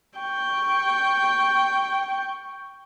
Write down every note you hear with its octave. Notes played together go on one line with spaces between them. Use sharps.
G5 C#6